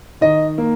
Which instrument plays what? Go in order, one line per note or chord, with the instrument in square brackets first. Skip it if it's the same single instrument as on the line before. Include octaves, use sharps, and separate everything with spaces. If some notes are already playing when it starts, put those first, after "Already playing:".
[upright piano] D#3 D#5
A#3